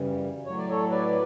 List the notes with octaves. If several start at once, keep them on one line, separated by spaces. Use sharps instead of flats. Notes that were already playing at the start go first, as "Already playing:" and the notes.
Already playing: F#2 C#3 E3 G3
A2 F#3 C#5
D5
A4 C#5
B4 D5